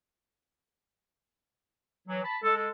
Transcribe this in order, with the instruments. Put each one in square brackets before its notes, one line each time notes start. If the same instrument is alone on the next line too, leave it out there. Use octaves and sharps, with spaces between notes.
[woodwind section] E3 F#3
A5 B5
[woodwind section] G#3 [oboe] A4
[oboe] A4